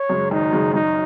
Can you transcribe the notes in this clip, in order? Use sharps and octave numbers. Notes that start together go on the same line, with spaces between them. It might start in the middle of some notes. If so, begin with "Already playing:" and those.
Already playing: C#5
F#2 C#3 G#3
G#1 D#4
F#2 C#3 G#3
F#2 D#4